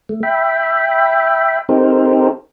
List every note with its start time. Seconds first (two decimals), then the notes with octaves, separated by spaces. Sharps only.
0.09 A3
0.23 E5 G5 B5
1.69 C4 D#4 G4 A4 A#4 C5